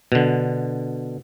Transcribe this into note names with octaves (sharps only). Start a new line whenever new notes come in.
B2 D3